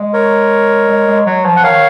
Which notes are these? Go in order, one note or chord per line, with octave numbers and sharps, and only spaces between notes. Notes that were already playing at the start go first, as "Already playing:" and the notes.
Already playing: G#3
A#4 C#5
G#3
G#3
F#3
F3
F#5
D#3 C#5 F5